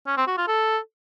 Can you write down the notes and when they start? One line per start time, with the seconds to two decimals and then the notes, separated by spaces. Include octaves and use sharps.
0.07 C#4
0.17 C4
0.27 F#4
0.37 F4
0.47 A4